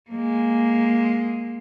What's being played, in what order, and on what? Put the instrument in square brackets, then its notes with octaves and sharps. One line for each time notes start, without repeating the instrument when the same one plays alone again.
[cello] G#3 A#3